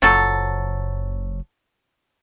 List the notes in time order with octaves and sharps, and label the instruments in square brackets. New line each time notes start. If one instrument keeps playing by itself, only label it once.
[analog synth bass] F#1 [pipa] F3 F#3 A4